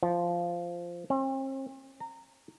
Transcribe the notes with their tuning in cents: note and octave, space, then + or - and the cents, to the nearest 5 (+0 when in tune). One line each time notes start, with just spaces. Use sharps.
F3 -10
C4 +45
A#5 -25